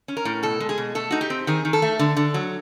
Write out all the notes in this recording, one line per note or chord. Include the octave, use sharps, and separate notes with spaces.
C#4
A#4
A2
B2 A4
G#3
G#4
B2
A3 A4
D#4 F#4
G4
C4
D#3 G#4
D#3
A4
A3
D3
D3
F#3